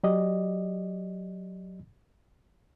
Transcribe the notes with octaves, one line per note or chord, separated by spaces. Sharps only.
F#3 G4 D5 D#5